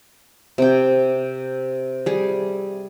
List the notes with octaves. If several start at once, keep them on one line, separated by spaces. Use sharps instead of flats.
C3 G5
G3 G#4